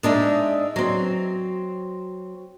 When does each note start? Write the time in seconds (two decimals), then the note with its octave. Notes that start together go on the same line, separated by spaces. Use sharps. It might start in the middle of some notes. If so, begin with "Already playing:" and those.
0.03 G#3 D4 D#4 E5
0.76 F#3 C4